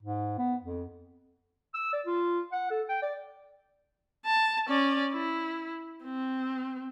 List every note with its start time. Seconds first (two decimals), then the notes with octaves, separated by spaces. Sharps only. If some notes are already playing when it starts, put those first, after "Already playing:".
0.03 G#2
0.38 B3
0.62 F2
1.74 E6
1.93 D5
2.06 F4
2.52 F#5
2.70 A4
2.89 G5
3.02 D5
4.26 A5
4.68 C#4 D5
5.13 E4
6.04 C4